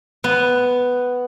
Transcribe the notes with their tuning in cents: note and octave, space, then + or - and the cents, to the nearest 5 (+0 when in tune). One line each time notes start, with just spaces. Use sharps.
B3 +5